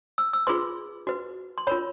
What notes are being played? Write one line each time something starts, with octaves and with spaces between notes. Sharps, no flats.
E6
E6
F4 G#4 B4 C6
F#4 B4
C6
F4 A#4 C#5 B5